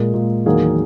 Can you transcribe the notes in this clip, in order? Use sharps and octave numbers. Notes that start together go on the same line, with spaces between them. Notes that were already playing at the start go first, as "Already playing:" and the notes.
Already playing: A#2 G#3 A#4
A#2 G#3
E2 D#3 F#3 A#3 G#4